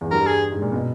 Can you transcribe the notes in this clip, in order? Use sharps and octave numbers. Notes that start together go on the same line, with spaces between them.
E2
G2 A#4
G#4
G#2
A#2
B2